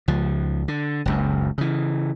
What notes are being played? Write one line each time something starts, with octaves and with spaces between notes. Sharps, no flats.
C#2 F3
D3
F#1 C#2 F#2
C#3 E3